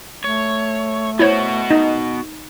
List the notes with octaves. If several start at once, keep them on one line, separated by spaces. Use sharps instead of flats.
A3 C#5
B3 E4 F#4 C5 C#5
D#4